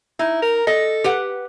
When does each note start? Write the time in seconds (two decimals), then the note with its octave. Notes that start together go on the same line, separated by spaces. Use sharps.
0.19 D#4 E4
0.42 A#4
0.67 A4 D#5
1.04 G4 B4 F#5